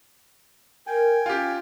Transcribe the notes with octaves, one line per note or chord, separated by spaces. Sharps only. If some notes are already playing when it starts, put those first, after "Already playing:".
A#4 G5 G#5
C#4 F4 G4